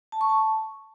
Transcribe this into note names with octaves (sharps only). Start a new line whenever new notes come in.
A5
C#6
A5